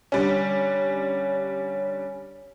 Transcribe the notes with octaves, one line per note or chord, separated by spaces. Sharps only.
D3 G3 C#4